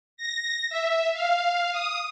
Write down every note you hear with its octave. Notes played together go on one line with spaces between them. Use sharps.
A#6
E5
F5
D#6